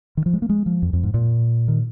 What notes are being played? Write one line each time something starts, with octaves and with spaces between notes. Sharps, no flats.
D#3
F3
G#3
A#3
G#3
F3
F2
F2
G#2
A#2
D#3